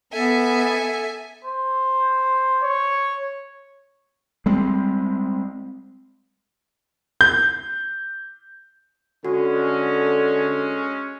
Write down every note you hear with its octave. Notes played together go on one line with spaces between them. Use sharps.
B3 A4 E5 G#5
C5
C#5
G3 G#3 C4
G6
D3 G#3 C#4 F#4 A4